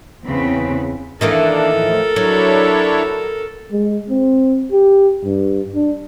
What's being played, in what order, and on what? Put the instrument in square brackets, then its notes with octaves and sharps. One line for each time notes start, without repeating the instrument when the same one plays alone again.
[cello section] E2 C#3 C4 B4
[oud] D#3 E3 A#3 [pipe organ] D4 [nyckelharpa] A4 A#4
[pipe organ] A2 F3
[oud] F#3 [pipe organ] D4 E4 C#5
[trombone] G#3
C4
G4
G2
D4